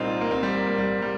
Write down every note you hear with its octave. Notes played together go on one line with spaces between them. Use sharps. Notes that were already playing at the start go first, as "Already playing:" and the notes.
Already playing: C2 A#2 G3 C4 D#4 F4
A#3
C4
G3
A#3
A#3
G3
G3